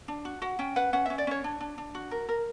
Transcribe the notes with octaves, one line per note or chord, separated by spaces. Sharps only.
D4
F#4
F#4 F#5
C#4 G5
B4 F#5
C#4 F#5
C#4 E5
D5
C#4 C#5
D4
D4
D4
F#4
A#4
A#4